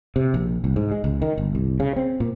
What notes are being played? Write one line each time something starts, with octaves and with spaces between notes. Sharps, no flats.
C3
A#1
C2
G#2
G#3
C#2
D#3
G1
C2
C#3
C4
A#2